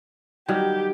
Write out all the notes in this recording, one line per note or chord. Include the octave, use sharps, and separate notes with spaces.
D#3 F#3 G3 G4